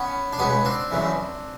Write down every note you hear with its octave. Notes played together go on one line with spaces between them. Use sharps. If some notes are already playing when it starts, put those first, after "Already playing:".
Already playing: B3 C#4
D4
C#2 B2 B3 C#4
C4 D4
F#2 C#3 E3